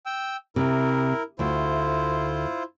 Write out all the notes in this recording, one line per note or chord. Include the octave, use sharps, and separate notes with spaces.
G5 E6
C3 E4 A#4
D2 E4 F4 C5 E5